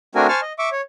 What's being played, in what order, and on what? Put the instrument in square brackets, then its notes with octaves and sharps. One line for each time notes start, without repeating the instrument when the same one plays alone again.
[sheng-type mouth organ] A3 C4 D4 F#4 A#4 G#5
C5 G#5 A5 C#6 F6
D#5
E5 C#6 D6
C#5